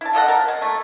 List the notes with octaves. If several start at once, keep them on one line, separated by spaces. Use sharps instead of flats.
E4 A5
F4 A4 D#5 F#5
A#4 A5
G#3
A3